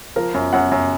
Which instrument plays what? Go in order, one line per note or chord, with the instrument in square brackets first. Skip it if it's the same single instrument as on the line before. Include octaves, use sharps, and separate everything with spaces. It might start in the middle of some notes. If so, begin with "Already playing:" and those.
[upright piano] F3 A#4
F#2
F#2 F#5
F#2